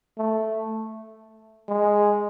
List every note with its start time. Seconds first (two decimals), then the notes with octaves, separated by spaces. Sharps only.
0.18 A3
1.69 G#3